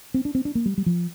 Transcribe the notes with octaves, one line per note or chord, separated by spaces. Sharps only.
C4
D4
C4
D4
A#3
G3
G3
F3